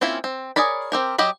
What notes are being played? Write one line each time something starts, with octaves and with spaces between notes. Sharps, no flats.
A#3 C4 C#4 E4 F4
C4
G#4 A#4 C#5 D5 B5
C4 G4 A#4
F#3 G4 D#5 B5